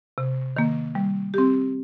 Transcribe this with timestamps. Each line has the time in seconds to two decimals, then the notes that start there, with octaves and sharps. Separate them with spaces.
0.18 C3
0.57 D#3 A#3
0.95 G3
1.34 C4 G4